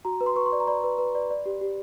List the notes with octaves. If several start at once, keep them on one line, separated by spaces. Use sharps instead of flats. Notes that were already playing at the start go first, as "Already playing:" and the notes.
F#4 A#5
B4
C6
B4 C#6
C6
D5
A#5
D5 B5
B4
B4
D5
D5
G4
G4